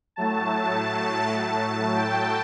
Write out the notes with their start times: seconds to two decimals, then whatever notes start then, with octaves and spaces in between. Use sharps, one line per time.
0.16 A2 F#3 A3 A5
1.35 A5
1.94 G5